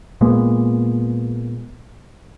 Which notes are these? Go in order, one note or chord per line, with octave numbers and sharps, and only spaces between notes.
A#2 G#3 A#3 B3